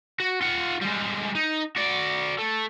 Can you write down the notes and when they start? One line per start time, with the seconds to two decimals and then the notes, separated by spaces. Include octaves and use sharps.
0.20 F#4
0.41 F4 F#5
0.82 G3 G#3
1.35 D#4
1.76 F#4 D5
2.39 A3